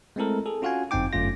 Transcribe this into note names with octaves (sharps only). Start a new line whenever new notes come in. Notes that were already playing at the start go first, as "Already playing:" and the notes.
G#3 A3 C4 E4 A4 A#4
G#4 A4
C#4 F4 F#4 F5 F#5 G#5
G1 F#2 C4 D#4 G5 D6
G1 F#2 A3 C#4 F4 A#6